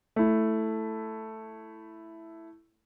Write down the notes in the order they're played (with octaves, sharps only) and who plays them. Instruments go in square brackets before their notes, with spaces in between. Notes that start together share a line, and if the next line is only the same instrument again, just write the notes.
[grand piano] A3 E4